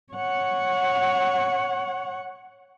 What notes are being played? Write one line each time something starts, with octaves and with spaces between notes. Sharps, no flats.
C#5 F#5